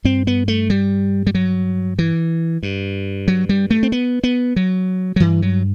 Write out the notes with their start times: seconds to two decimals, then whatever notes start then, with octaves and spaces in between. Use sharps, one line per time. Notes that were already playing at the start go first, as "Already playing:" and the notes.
0.04 G2 C4
0.27 B3
0.48 A3
0.70 G3
1.27 G3
1.35 F#3
1.99 E3
2.63 G2
3.28 F#3
3.49 G3
3.70 A3
3.83 C4
3.92 B3
4.24 B3
4.56 F#3
5.16 F#3
5.20 G2 E3
5.42 F#3